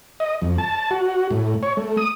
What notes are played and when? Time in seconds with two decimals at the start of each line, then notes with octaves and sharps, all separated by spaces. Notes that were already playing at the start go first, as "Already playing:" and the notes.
0.20 D#5
0.42 F2
0.58 A5
0.91 F#4
1.31 A2
1.63 C#5
1.77 A3
1.97 D#6